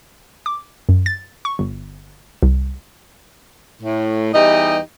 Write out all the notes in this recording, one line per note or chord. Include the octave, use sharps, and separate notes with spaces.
D6
F#2
A6
C#6
G1
C2
A2
E2 E3 G3 D#4 G4 D#5